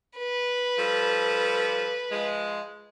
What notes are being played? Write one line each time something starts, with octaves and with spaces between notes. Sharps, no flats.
B4
F3 G3 A4
F3 G#3